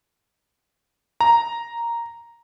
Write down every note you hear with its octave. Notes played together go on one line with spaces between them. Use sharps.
A#5